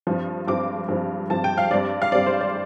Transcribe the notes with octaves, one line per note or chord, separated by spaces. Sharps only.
G2 F3 C4
G2 F3 C4 D6
G2 F3 C4
G2 F3 C4 A5
G5
F5
G2 G3 C4 D5
F5
G2 G3 C4 D5
C5
D5